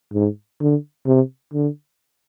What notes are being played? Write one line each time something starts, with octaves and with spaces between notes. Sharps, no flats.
G#2
D3
C3
D3